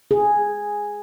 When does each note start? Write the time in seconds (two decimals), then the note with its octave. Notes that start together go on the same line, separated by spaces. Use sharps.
0.11 G#4